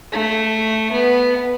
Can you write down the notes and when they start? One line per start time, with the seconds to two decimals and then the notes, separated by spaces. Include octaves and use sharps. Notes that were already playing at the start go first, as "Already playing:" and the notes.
0.12 A3
0.92 B3